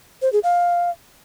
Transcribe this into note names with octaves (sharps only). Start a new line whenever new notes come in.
C5
G#4
F5